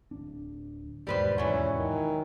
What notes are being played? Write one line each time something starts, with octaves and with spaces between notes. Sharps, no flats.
D1 D4
E1 D#2 G#2 G3 B4 C5
E3 F#3 C#4
D#3